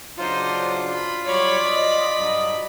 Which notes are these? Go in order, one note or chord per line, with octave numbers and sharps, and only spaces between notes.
C#3 F#3 D4 D#4 F4 C5
B5
F#3 G3 C#5 D5 B5
D#5
G2 F#3